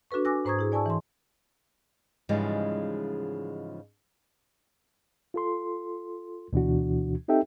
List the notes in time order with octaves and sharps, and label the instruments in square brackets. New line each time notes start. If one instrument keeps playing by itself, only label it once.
[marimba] D4 F#4 A4 B4 C#6
G#5 D6 E6 F#6 A#6
G#2 C5 A#5 C#6 D#6 G#6
E4 G#4
D5 G#5 A5 C#6 E6
E3 C6
[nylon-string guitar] G#2 C#3 E3 F3 G3 G#3
[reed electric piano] F4 A4 C6
D2 B2 E3 D4 F#4
C4 D#4 G4 A4 E5 G5